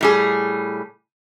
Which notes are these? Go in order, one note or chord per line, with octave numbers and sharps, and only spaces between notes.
A2 G3 G#4